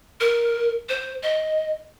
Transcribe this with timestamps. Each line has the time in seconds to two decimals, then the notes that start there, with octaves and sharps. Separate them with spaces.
0.20 A#4
0.89 C5
1.23 D#5